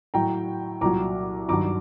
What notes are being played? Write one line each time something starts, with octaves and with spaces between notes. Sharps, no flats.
A2 F#3 G5 A#5
C2 A#2 F#3 A#5 D6
G2 D#3 F#3 A#5 D6